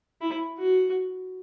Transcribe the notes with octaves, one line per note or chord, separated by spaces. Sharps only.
E4
F#4